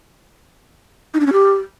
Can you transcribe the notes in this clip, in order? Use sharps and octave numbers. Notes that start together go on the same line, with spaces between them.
D#4
D4
C#4
G4